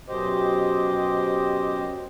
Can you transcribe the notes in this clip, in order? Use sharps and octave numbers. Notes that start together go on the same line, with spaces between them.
F#2 B2 G4 C5 D#5